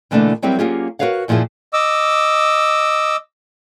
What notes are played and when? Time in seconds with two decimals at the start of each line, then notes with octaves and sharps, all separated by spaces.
0.11 B2 D3 E3 A3 A#3 D4
0.42 F#3 G3 C4 E4 G4 A#4
0.59 F#3 A#3 C#4 F4 G4 G#4
0.99 F#4 A#4 B4 C#5 F5 F#5
1.28 F#2 A#2 F3 E4 G#4
1.73 D#5 D6 E6